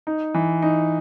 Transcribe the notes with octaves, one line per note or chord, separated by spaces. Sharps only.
D#4
E3
D#4